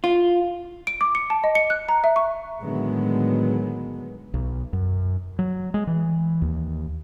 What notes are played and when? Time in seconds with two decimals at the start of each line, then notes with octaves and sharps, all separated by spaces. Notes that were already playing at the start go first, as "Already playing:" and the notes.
0.04 F4
0.87 D7
1.01 D6
1.15 C#7
1.30 A5
1.44 D#5
1.55 C#7
1.70 F#6
1.89 A#5
2.04 E5
2.16 C#6
2.61 A2 D3 D#3 F#3 G#3 B3
4.34 B1
4.73 F#2
5.39 F#3
5.74 G#3
5.87 E3
6.42 D#2